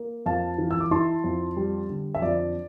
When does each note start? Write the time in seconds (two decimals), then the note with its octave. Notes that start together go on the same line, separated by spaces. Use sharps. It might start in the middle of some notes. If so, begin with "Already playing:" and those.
Already playing: A#3
0.26 F2 F5 A5
0.58 E3
0.71 E6
0.80 D6
0.91 E4 A5 C6
1.24 F2
1.56 G3
1.89 D3
2.15 E5
2.22 F2 D5